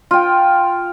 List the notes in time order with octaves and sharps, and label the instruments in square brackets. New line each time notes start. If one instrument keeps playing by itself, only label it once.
[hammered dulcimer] F4 G5